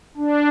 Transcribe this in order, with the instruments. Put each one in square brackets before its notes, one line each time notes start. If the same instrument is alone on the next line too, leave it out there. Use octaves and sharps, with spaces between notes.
[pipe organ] D4